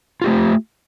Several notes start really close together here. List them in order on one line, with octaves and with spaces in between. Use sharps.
F4 G4 A3